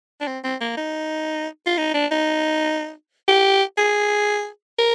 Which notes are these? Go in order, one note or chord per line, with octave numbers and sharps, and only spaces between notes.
D4
C4
C4
A#3
D#4
F4
D#4
D4
D#4
G4
G#4
A#4